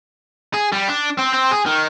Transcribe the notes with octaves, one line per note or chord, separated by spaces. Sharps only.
G#4
G3
D4
C4
C4
G#4
D#3